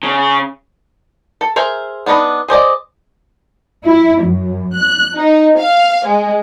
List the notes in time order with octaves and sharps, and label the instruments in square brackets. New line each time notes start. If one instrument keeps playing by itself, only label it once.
[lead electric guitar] C#3
[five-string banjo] A4
G#4 A#4 C5 E5
B3 D4 D#4 A#4 B4
G#4 C5 D5 D#5
[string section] E4
F#2
F#6
D#4
F5
G#3